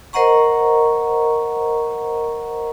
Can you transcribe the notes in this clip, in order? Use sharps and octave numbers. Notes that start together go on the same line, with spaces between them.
A#4 C5 D#5 F#5 A#5 C#6